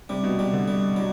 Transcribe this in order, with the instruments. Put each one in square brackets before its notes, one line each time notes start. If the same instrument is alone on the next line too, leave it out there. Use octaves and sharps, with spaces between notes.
[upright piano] C3 [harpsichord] G3
[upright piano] B2
[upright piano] C3 [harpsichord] G3
[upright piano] D3
[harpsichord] G3
[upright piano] F#3 [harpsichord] G3